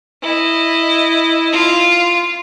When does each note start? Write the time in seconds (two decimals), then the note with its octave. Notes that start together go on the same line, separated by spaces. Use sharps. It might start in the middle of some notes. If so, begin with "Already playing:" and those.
0.22 E4 D#5
1.53 F4